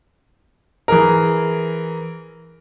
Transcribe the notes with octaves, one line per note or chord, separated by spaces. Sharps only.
E3 G#4 A#4